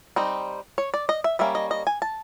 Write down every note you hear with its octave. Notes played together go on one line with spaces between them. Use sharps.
G3 C4 D#4
C#5
D5
D#5
E5
G3 A#3 C#4 E5
D#5
D#5
G#5
A5